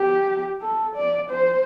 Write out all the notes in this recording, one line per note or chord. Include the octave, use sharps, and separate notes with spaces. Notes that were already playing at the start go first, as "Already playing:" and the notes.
Already playing: G4
A4
D5
C5